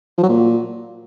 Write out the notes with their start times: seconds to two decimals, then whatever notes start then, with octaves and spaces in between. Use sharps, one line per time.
0.18 F3
0.23 F#3
0.29 A#2